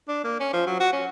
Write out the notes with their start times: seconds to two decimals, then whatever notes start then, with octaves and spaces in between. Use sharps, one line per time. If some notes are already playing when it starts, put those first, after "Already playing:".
0.08 D4
0.24 A#3
0.40 C#4
0.53 F3
0.67 F#3
0.80 F#4
0.93 C#4